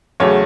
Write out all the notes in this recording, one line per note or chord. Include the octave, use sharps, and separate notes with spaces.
E2 C#3 F#3 A3 C#5